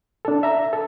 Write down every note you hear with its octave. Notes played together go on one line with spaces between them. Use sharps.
D4 A4
E5 A#5
A4